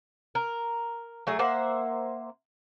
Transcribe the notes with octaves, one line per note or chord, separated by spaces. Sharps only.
A#4
F#3 A3 G#4
A#3 C5 E5 F#5